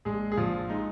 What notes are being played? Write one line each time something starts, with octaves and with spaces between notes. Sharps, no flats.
A#1 G#3 G#4
G#4
A#1 F3 F4
G#3 D#4